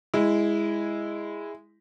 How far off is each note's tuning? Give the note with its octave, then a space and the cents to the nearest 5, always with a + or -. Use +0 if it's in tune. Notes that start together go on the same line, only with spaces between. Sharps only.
G#3 -10 E4 +0